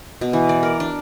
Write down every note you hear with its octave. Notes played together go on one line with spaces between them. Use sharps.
B2
E3
D5
A#4
D4